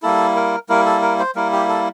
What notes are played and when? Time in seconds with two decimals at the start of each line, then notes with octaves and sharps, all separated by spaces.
0.03 G3 A#3 E4 A4
0.36 A#4
0.69 G3 A#3 E4 A#4
0.86 A4
1.02 A#4
1.19 C5
1.36 G3 A#3 E4 A#4
1.53 G4
1.69 A4